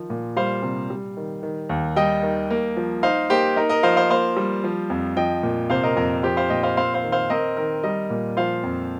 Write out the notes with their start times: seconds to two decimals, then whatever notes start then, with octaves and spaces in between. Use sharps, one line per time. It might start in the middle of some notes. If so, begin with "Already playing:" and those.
Already playing: D#3 F3
0.10 A#2
0.36 G3 C5 F5
0.63 C3
0.90 G3
1.17 D#3
1.43 D#3
1.69 D#2
1.96 G3 D#5 G5
2.23 D#3
2.50 A#3
2.77 F3
3.03 D#4 C5 F5
3.30 A#3 G4 C5
3.56 D#4 A#4
3.69 A#4 D#5
3.83 F3 C5 F5
3.96 C5 F5
4.10 A#3 C5 F5
4.37 G3
4.64 F3
4.90 F2
5.16 F3 D#5 G5
5.43 A#2
5.70 C3 C5 F5
5.83 A#4 D#5
5.96 F2 A#4
6.23 F3 G4 C5
6.37 C5 F5
6.50 A#2 D#5 G5
6.63 C5 F5
6.77 C4 C5 F5
6.94 C5 F5
7.04 D#3
7.12 C5 F5
7.30 C4 A#4 D#5
7.57 D#3 A#4
7.83 G3 A#4 D#5
8.10 A#2
8.37 F3 C5 F5
8.63 F2